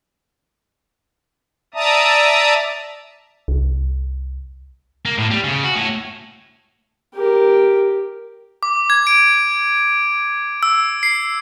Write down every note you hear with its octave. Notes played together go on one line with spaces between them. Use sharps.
D5 E5 A5 A#5 D#6
C2
A#3
A2
G3
C#3
F#4
A2
G4 A#4
D6
G#6
D7
E6
C7